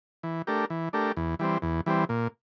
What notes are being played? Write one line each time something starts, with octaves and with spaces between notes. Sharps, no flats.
E3
A3 D4 G4 A#4
E3
A3 D4 G4 A#4
E2
E3 G3 C4
E2
E3 G3 C4
A#2